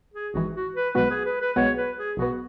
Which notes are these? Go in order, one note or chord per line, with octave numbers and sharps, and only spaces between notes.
G#4
G#1 G#2 E3 F#4
F#4
B4
B1 B2 G#3 B3 F#4 B4
G#4
B4
B4
B1 B2 G#3 B3 F#4 C#5
B4
G#4
B1 B2 B3 F#4